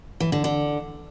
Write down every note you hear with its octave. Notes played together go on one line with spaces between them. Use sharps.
E3
D3
D3